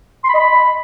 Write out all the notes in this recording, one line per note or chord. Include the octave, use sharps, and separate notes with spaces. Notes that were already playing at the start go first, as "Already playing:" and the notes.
C6
B5
D#5
B5